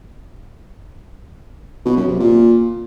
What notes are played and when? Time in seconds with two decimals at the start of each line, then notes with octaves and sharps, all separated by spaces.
1.85 B2
1.97 F#2
2.08 C3
2.19 A#2